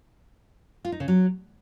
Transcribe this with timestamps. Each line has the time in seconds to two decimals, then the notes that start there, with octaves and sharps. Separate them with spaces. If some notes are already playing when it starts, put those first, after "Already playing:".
0.85 F4
0.92 D#4
1.00 C#3
1.08 F#3